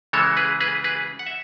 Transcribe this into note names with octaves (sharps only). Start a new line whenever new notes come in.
C#3 E3 G#3 A4 C#5
G#4 B4
G#4 B4
G#4 B4
F#5
E5